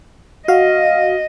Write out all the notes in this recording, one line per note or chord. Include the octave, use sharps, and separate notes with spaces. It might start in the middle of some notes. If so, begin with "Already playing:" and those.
F#4 D#5 F5